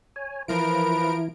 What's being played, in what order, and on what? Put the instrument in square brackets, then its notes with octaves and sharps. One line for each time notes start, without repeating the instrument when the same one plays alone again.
[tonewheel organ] C#5 G#5
[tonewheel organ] E3 E4 [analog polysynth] F3 A#4 D7 [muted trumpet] B4